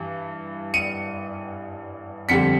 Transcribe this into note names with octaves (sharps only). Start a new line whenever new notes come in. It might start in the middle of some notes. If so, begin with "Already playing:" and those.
Already playing: G2 E3
C#7 D#7
F2 D3 G3 B6 C#7